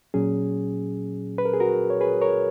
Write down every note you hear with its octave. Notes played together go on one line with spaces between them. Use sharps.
A#2 F#3 C#4 G#4
B4
A#4
G#4
F#4 A#4
C#5
G#4 B4
A#4 C#5